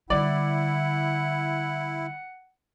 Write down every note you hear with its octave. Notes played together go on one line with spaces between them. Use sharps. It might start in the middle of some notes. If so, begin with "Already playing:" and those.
D3 G3 E4 D5 F#5